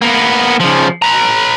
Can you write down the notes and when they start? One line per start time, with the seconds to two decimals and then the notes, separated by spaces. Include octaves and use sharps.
0.02 A#3 B3
0.60 C#3 F3
1.02 B4 A#5